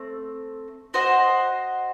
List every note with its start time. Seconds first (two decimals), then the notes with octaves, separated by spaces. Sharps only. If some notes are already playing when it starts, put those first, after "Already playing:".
Already playing: A3 C4
0.94 F#4 C5 D#5 F#5